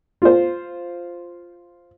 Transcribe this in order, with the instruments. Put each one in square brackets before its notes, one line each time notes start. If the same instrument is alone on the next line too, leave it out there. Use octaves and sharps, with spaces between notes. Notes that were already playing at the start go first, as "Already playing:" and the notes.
[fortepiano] F4 C5